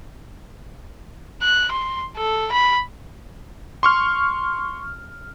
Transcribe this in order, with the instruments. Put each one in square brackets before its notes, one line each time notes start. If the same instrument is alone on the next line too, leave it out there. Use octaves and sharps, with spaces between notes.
[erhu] F#6
C6
A4
B5
[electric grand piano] C6 C#6 F6